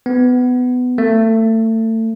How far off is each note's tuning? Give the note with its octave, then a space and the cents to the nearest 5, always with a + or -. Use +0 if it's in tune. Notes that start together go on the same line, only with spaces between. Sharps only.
B3 +15
A3 +30